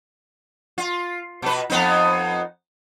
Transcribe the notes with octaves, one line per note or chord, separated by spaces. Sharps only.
F4
B2 B4
F2 B3 D#4